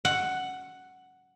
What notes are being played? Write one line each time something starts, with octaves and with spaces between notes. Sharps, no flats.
F#5